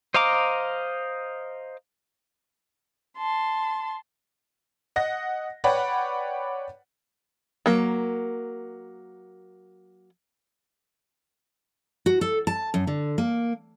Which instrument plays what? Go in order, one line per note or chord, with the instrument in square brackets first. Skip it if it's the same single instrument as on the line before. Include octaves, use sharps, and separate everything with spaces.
[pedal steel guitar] C5 D#5 F5 A#5 D6
[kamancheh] A5 C6
[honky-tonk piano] D#5 F#5 A#6
B4 C#5 D5 F#5 G5 B5
[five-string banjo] F#3 A#3
[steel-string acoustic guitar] F#4
A4
A5
F#2
D3
A#3